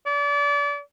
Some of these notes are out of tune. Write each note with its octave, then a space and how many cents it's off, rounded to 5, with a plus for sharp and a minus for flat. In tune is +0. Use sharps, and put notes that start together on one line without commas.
D5 -35